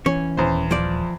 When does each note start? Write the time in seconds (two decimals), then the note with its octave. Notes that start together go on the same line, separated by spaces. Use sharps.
0.06 E3 C#4 C#5
0.37 D#1 E2 C5
0.71 F3 D5